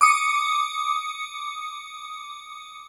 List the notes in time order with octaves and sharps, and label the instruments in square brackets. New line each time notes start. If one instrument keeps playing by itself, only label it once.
[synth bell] D6 D#6 C#7